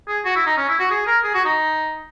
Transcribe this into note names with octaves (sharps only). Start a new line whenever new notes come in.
G#4
F#4
E4
D#4
C#4
E4
F#4
G#4
A#4
G#4
F#4
D#4